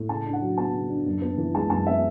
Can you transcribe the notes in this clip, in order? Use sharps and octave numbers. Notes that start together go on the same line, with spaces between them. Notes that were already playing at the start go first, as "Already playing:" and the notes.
Already playing: A2
C#3 A5
D4
F#5
F#3
B3 A5
C#3
D4
F#2
B3
E3
G#3 A5
F#2 A5
B3 E5